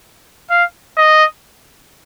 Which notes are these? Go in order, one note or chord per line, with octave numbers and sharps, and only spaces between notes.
F5
D#5